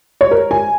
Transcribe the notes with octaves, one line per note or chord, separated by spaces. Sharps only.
C#5
A#4
G#5